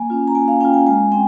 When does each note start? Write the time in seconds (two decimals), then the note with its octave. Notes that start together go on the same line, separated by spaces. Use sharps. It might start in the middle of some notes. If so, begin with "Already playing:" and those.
Already playing: A#3 G#5
0.10 C#4 F4
0.28 A#5
0.35 A#3 G#5
0.48 F5
0.61 C#4 F4 G5
0.74 G#5
0.86 G#3 G#5
1.11 C4 G5